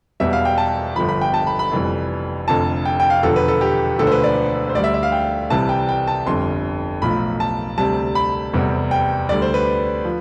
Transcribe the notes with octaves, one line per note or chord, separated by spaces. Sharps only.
E1 E2 B2 G3 E5
F5
G5
A5
G1 G2 D3 F3 B5
B5
G5
A5
B5
B5
F1 F2 E3 G3
F1 F2 D3 F3 A5
G5
G5
F5
E1 E2 D3 F3 A4
B4
A4
G4
E1 D2 D3 F3 A4
C5
B4
D5
C5
D2 D3 G3 D5
E5
E5
F5
G5
C2 C3 E3 G3 A5
G5
G5
A5
G1 F2 D3 G3 C6
B1 A2 F3 B5
A5
D2 C3 G3 A5
B5
F1 E2 C3 G3
G5
D2 D3 G3 D5
C5
B4
F3